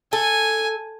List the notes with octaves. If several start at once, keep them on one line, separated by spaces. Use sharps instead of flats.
A4 G#5